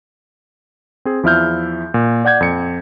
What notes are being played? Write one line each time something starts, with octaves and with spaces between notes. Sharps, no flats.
C4 G#4
E2 F3 E4 E5 F6 G6
A#2
D5 F#5 G6 G#6
F2 C#7